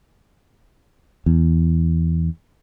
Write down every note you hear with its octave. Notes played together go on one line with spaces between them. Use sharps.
E2